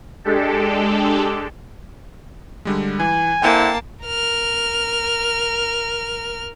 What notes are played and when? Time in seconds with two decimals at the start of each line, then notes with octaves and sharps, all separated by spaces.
0.24 G#3 D4 G4 A4
2.65 D3 G3 G#3
3.00 E3 G#5
3.42 D3 A#3 C4 E4 G5 A5
4.04 A#4 F6